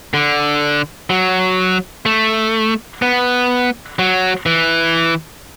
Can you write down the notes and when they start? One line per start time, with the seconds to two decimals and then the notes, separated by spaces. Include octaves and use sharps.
0.14 D3
1.10 F#3
2.06 A3
3.02 B3
3.99 F#3
4.46 E3